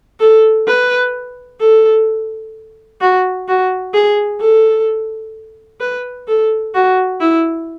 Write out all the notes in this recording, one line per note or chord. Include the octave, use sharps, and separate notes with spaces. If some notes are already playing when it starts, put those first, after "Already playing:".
A4
B4
A4
F#4
F#4
G#4
A4
B4
A4
F#4
E4